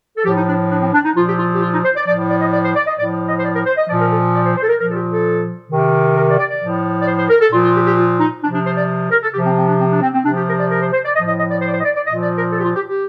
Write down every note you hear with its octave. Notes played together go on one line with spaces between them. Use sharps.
A4
A2 F3 G4
D#4
D4
D4
C4
D4
D#4
A#2 F3 F4
G4
F4
G4
F4
D#4
C5
D5
A2 F3 D5
D5
D#5
D5
C5
D5
D#5
A2 F3 D5
D#5
C5
D5
A#4
C5
D#5
A#2 F3 D5
A#4
A4
D5
C5
C5
A4
A#4
A#2 F3 A#4
A4
G4
A4
C3 D#3
A#4
D5
D5
D5
A2 F3
D5
C5
C5
A#4
A4
A#2 F3 F4
F4
G4
G4
F4
D#4
C3 F3 D4
D4
C5
D5
A#4
A4
C3 F3 G4
C4
C4
D4
C4
D4
C4
C4
C3 F3 D4
G4
A#4
D5
A#4
C5
C5
D5
A2 F3 D#5
D#5
D#5
D5
C5
D5
C5
D#5
D5
D5
A#2 F3 D#5
D5
A#4
A4
G4
F4
G4
G4